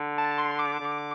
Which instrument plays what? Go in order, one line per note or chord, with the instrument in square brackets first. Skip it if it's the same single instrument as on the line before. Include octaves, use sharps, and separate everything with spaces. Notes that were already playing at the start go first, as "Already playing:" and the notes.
Already playing: [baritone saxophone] D3
[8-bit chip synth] A5
C6
D6
[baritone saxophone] D3